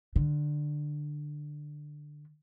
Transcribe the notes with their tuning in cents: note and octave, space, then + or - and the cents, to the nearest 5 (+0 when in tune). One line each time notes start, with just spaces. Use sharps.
D3 +15